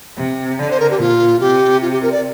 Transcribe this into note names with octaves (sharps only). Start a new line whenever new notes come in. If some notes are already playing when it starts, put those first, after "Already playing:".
C3
D3 D5
C5
A#4
G4
A#2 F4
C3 G4
F4
G4
A#4
D5